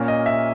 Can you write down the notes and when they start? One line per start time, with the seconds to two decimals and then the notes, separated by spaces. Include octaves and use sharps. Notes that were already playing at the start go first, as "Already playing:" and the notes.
Already playing: A#2 A#3 C#4
0.08 D#5
0.26 E5